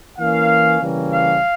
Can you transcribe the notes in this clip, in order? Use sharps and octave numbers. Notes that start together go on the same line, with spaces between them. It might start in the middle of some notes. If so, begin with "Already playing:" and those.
E3 A#3 C#4 F5
C#3 E3 G3 A#3 C#4
F5